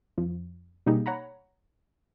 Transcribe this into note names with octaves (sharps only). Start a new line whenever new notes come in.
F2 F3
B2 G3 A#3 D#4 G4 G#4
C#5 F#5 A#5 B5